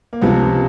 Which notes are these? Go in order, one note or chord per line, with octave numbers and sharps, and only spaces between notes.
A#3
C#2 C3 F3 B3